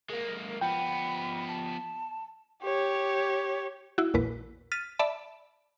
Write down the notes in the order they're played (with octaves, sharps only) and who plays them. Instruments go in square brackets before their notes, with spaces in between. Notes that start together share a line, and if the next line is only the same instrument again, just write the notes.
[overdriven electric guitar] G#3 A#3 [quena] A#4
[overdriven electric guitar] F3 B3 [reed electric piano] G5 [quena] B5
[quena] A5
[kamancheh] G4 C#5
[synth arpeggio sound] E4 F#4
A#1 E2 A#2 B4
F6 A6 B6 D#7
D5 E5 A5 B5